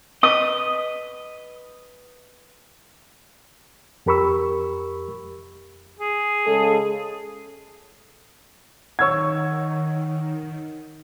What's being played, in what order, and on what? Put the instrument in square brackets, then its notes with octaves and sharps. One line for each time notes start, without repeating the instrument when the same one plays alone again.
[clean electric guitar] B4 D#5 [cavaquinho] D#6
[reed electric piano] F2 G4 A#4 B5 C#6 E6
[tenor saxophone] G#4
[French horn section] C#3 G#3 A4
[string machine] D#3 [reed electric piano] C#5 F#5 [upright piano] C#6 E6 G#6